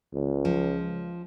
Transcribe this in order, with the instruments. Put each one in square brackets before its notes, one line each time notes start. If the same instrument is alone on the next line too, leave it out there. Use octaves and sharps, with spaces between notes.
[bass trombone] C#2
[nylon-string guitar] F3